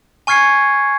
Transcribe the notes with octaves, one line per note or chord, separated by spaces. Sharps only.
G#5 C#6 F6 G#6 C7 C#7